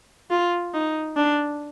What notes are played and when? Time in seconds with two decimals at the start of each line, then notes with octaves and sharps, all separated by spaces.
0.31 F4
0.74 D#4
1.17 D4